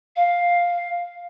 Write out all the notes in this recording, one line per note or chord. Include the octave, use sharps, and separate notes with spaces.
F5